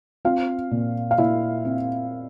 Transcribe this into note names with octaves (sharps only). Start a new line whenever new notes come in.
C4 F4 F5
A#2
F5
A#2 E4 E5
C4